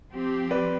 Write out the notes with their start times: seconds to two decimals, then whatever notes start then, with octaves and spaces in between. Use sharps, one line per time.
0.11 F3 C4 G4
0.51 B4 D5